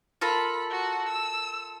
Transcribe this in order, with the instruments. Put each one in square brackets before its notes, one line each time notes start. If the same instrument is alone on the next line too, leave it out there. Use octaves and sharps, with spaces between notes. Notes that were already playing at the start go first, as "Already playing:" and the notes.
[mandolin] F4 A4 A#4 [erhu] B5
[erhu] F#4
E6